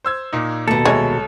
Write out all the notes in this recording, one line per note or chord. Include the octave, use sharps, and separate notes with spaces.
C5 E6 G#6
A#2 A#3 D#4
D#2 B2 A4
C2 G#3 C#5